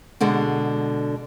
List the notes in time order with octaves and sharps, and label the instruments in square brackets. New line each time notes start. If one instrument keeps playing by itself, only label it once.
[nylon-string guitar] B2 D3 G#3